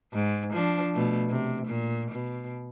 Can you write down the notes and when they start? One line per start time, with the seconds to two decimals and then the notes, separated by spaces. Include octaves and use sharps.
0.14 G#2
0.53 F3 D4
0.94 B2 A3
1.29 C3
1.66 A#2
2.11 B2